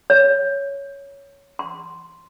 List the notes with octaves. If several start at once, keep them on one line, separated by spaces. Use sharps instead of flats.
C#5
C6